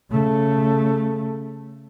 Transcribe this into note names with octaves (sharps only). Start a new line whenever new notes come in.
C#3 A3